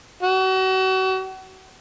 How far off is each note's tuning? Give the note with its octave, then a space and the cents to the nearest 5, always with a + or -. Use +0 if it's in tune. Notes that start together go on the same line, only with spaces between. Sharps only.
F#4 +35